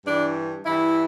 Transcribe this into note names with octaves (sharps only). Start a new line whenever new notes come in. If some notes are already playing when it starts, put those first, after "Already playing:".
G2 E3 D4
G2 E3 E4